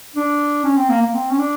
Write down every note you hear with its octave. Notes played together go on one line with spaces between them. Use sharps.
D4
C#4
C4
A#3
A#3
C4
C#4
D4